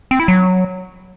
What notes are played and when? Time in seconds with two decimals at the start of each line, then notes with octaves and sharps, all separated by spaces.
0.11 C4
0.20 E4
0.28 F#3